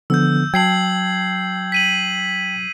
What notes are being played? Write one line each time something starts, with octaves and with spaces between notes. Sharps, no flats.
D3 F3 B3 E6 G6
F#3 G5 A5 G#6 C7 F#7
B6 D#7 F#7